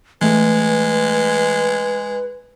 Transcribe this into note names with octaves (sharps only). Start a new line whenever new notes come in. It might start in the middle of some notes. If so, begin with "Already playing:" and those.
E3 G#3 A3 B4